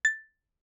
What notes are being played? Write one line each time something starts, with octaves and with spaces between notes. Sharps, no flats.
A6